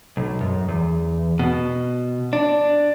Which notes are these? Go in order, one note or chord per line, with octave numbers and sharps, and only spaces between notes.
B1
F#2
E2
B2
D4